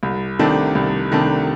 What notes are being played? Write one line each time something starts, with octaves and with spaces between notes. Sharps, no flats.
C2
C3 D#3 A3 D4
C2
C3 D#3 A3 D4